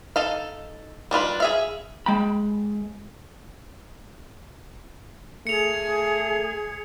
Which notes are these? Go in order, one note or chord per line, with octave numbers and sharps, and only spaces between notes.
D#4 A4 F5
G3 D4 F4 B4
G#4 E5 F5
G#3 G5 B5
A3 G#4 C#7 F7